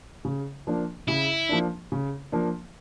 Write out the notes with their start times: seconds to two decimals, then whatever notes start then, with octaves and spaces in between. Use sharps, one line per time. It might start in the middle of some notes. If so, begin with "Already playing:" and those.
0.25 C#3
0.67 F3 A#3 D4
1.08 C#3 E4
1.49 F3 A#3 D4
1.92 C#3
2.32 F3 A#3 D4